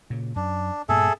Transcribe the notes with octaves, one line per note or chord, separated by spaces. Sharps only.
A#2 C#3
F#2 D4
G2 A#2 B3 G#4 A4 E5